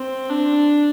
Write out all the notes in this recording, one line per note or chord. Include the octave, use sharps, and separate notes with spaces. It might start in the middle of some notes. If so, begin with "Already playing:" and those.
Already playing: C4
D4